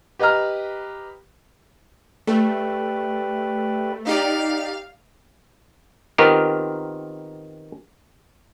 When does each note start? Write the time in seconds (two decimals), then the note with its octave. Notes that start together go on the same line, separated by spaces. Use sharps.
0.19 G4 B4 D#5 F5 A#5 F6
2.27 A3 G4 B4 D5
4.07 D#4 G4 D5 F5
6.18 D#3 B3 C4 F4 G4 A#4